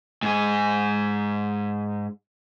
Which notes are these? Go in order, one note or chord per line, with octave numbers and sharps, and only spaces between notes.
G#2 G#4